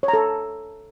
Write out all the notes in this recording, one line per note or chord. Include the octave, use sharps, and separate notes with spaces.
C#5
A#5
A4